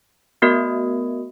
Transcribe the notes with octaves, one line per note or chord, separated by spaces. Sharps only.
A3 B3 F#4 A#4 D#5